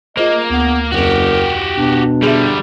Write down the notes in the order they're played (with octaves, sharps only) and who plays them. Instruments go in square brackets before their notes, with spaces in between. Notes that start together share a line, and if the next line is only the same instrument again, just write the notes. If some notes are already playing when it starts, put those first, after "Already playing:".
[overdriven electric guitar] A#3 [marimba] F4 G#4 C5 [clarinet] D#5
[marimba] D2 [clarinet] B3
[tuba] F#1 [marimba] F2 C4 [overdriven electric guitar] F#4 G4 [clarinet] A#4
[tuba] B2 [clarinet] D4
[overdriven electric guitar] D3 G3 [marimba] G#4 E5